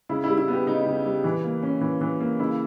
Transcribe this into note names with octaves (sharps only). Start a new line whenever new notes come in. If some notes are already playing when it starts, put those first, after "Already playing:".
C#3 E4
E4
G3
E4
B3 G4
C#3 D#4
C#3
G3
E3
A#3
C#4
E3
E3
A#3
C#3 E4